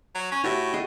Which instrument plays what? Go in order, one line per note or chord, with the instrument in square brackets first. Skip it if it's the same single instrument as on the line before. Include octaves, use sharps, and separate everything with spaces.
[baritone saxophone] F#3
C#4
[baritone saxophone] A2 [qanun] F#4 G4 E5
[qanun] F#4 G#4 D#5